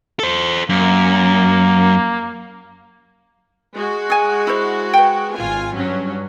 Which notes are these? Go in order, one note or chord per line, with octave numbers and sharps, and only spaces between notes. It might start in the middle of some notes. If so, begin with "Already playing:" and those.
A4 C5
F#2 A#3
G#3 F#4
G#4 G#5
E4 C5
B4 G5
G#1 F4 G#5
G2 F#3 C#4